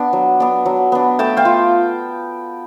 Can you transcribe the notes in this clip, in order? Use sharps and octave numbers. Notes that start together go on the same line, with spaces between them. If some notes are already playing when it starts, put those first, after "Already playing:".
Already playing: B3 D4
F#3
B3 D4
F#3
B3 D4
A3 G5 A5
F5 G5
F4